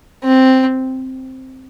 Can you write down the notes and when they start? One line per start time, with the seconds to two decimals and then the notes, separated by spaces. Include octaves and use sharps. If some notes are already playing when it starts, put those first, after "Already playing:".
0.23 C4